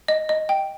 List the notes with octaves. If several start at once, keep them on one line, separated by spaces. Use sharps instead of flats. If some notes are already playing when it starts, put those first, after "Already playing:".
D#5
D#5
G5